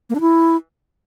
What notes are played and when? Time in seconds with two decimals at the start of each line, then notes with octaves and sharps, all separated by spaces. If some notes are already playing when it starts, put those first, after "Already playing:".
0.10 A#3
0.15 D4
0.21 E4